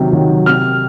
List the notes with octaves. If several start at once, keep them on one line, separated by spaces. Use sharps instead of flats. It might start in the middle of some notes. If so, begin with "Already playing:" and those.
Already playing: C3 D#3 F#3
D#3 F#3
C3 F6